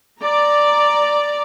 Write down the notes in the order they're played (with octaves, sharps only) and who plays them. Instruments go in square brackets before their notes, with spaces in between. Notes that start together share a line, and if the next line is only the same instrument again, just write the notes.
[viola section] D5 A#5